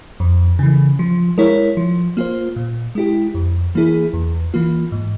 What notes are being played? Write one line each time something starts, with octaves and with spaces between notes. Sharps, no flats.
F2
C#3 E3
F3
G#3 E4 A#4 C#5
F3
A#3 F4 C5
A#2
G#3 E4 G4
F2
E3 A#3 E4 G#4
E2
E3 A#3 F4
G#2